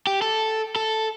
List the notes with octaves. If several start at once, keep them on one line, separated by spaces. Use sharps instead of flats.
G4
A4
A4